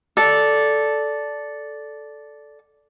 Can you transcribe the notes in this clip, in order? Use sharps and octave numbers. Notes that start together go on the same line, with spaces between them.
A4 D5